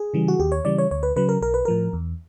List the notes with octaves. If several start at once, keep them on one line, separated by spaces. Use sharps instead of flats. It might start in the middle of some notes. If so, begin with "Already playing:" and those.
Already playing: G#4
C#3 E3 G3
F#4
D#2 G4
C#5
C#3 E3 G3 D5
C#5
D2 C#5
B4
C#3 F#3 B4
A#4
B1 A#4
B4
A2 F3 A#4
E2